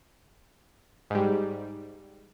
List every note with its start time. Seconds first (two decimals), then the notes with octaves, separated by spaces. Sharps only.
1.10 G#2 G3